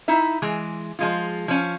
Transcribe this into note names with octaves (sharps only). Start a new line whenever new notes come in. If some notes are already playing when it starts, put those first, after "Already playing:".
D#4 E4 E5
E3 G#3
F3 G#3 F4
F3 C#4